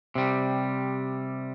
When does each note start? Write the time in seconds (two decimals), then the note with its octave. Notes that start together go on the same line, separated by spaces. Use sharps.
0.15 C3 G3